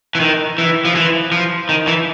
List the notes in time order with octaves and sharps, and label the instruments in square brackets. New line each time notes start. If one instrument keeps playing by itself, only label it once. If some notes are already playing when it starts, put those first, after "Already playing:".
[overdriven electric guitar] E3
D#3
E3
F3
E3
F3
D#3
E3